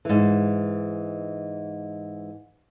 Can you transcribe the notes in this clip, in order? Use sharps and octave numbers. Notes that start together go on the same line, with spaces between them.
G#2 E3